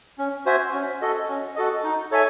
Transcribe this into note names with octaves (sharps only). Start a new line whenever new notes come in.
C#4
F#4 C5 E5 G#5
C#4
F#4 A4 D#5
C#4
F#4 A4 D#5
D#4
A4 C#5 E5 G#5